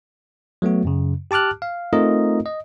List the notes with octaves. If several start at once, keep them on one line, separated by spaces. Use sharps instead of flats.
F#3 A3 B3 F#4
F#2 C#3
G4 A5 D6 F6 F#6
F5
A3 C4 D#4 F4 A#4 D#5
D#5